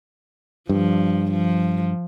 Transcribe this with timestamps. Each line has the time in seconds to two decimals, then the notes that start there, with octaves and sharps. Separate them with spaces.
0.69 G2 F3
1.31 F3